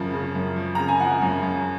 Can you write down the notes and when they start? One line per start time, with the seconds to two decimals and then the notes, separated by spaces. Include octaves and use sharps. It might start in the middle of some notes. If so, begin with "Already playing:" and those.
Already playing: F#2 C#3 F3
0.14 C#3
0.35 F#2
0.56 F3
0.75 C#3 A#5
0.88 G#5
1.00 F3 F#5
1.22 F#2
1.42 F#2